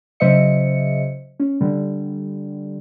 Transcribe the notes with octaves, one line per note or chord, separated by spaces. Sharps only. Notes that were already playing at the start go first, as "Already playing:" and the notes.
C#3 F#3 C5 D#5 E5 C#7
C#4
D3 G3